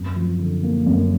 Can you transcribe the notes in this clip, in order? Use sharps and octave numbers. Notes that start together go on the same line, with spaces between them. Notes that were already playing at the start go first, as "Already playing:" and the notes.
Already playing: F#2
F3
D3
A#3
F#2